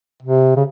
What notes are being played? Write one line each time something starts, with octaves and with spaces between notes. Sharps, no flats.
C3
C#3